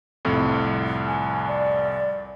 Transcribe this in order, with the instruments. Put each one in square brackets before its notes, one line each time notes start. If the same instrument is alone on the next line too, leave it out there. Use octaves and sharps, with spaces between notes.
[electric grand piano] C2 F2 A2
[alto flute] G#5
D5